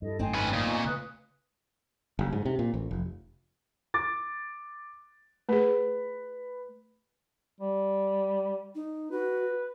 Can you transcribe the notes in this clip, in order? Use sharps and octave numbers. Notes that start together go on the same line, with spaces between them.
G2 E4 A4 D#5
G#1 F#2 A3 C4 D#4 G5 G#5 C6
C#4 B4
A#2 F4 A#4 D#6
B3 D#5 G#5 C#6
C#3 A3 B4 D#6 F#6
F#1
G#2
C3
A#2
A1
F1
D6 A6
A3 G#4 B4
G3
D#4
F#4 B4